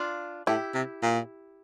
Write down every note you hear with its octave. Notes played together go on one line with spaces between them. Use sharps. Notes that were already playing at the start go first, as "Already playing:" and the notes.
Already playing: D4 F4
A2 E4 G4
C3
A#2